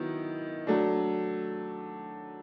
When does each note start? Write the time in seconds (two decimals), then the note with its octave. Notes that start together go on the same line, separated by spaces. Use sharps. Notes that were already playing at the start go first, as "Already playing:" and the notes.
Already playing: D#3 F#3 B3 E4
0.67 F#3 A3 D4